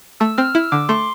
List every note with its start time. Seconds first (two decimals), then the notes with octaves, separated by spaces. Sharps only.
0.20 A3 E6
0.38 C4 F6
0.55 E4 E6
0.72 D3 D6
0.89 A3 C6